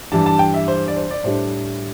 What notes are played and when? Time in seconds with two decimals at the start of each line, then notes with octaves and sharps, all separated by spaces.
0.12 G2 E3 G3 D4 A5
0.26 A5
0.39 G5
0.54 E5
0.68 C5
0.88 D5
0.96 C5
1.11 D5
1.24 A2 G3 D4 C5